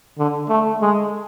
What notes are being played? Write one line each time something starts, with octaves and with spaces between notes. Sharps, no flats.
D3
A3
G#3